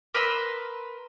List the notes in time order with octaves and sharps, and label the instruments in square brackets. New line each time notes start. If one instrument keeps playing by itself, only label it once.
[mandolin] A#4 B4 C6 E6